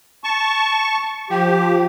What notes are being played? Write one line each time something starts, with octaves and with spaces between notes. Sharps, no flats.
A5 C#6
F3 G4